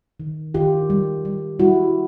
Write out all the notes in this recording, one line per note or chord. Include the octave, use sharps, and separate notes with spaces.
D#3
D#3 F4 G4
G3
G3
G3 E4 F#4